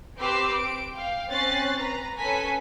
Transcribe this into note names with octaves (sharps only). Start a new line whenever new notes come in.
C4 G4 B4 C6 D6 E6
D7
F5 G5
C4 C#4 F#6 A6 C7
B4 A#5
C#4 A4 B4 G#5 B6